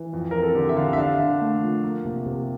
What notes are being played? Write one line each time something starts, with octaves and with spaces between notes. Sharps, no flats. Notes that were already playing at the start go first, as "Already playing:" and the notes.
Already playing: E3
F2
C4 A#4
A4
D3 G4
E5
D3 F5
E5
D4 F5
D3
A3
F3
A#3
C3
C3